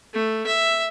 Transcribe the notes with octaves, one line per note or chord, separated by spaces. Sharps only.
A3
E5